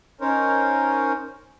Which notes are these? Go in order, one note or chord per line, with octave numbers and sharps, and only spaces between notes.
C#4 D#4 A#4 C5 C#5